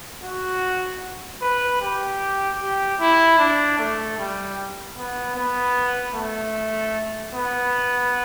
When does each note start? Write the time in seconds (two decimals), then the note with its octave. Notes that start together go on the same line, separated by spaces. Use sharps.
0.23 F#4
1.42 B4
1.82 G4
2.60 G4
3.00 E4
3.39 D4
3.79 A3
4.18 G3
4.97 B3
5.36 B3
6.15 A3
7.34 B3